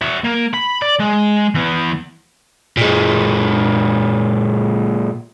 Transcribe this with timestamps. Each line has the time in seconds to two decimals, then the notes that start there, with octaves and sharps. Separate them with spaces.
0.02 F#4 E5
0.24 A#3
0.53 B5
0.82 D5
1.00 G#3
1.55 E3 B3
2.77 A#2 G#3